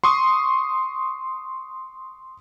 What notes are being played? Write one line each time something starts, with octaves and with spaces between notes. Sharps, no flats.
C6 C#6 D#6